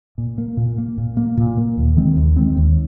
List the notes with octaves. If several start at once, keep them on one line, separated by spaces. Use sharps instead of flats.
A#2
A#3
A#2
A#3
A#2
A#3
A#2
A#3
D#2
D#3 G#3 C4
D#2
D#3 G#3 C4
D#2